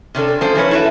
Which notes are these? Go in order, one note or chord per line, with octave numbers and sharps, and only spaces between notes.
C3 C#4 D4 A4
F3 A3 C#4 A4 C5
E3 A#3 C#4 G#4 B4 C#5
E4 F#4 A4 B4 E5